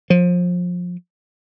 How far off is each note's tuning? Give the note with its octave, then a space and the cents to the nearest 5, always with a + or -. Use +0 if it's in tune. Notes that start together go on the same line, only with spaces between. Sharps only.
F3 +25